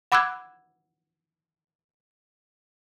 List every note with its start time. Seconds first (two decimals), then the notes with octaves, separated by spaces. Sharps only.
0.12 F#5 B5 D6 E6 F#6 G#6